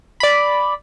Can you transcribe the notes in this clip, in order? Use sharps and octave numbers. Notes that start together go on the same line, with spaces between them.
D5 B5